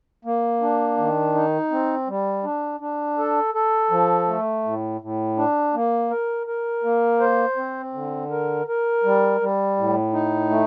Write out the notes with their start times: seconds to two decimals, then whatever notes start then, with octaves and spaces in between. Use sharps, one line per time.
0.25 A#3
0.61 D4
0.97 D#3
1.35 D#4
1.71 C4
2.08 G3
2.44 D4
2.80 D4
3.18 A4
3.54 A4
3.90 F3
4.27 A3
4.64 A2
5.01 A2
5.37 D4
5.74 A#3
6.10 A#4
6.47 A#4
6.84 A#3
7.20 C5
7.56 C4
7.94 D3
8.30 A#4
8.67 A#4
9.04 G3
9.40 G3
9.77 A2
10.13 D#4
10.50 A3